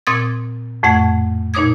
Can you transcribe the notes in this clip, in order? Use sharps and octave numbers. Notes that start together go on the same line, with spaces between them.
A#2 C4 C6 D#6 G#6 A6
F2 A2 A3 F#5 G#6
A#2 D#4 C#5 D6 D#6 G#6